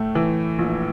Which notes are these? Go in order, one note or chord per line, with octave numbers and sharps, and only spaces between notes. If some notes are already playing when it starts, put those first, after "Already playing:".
Already playing: A2 A3
E3
A#1